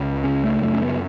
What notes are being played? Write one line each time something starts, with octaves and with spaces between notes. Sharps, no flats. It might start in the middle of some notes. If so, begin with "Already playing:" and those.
Already playing: C#2
C#3 C#4
A3
F#2 A3
C#4
B3